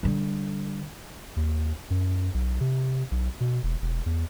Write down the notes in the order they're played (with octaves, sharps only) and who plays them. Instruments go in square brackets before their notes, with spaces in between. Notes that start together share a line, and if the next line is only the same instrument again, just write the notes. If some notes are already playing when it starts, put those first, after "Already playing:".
[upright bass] D3 G3
[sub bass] D#2
F#2
B1
C3
B1
B2
E1
E1
E2